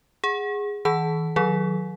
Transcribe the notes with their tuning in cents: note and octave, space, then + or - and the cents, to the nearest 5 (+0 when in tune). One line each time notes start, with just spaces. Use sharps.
G#4 -10 F#5 +0
E3 -45 G#4 +45 A5 +0
D#3 +0 F#3 -15 G#4 +40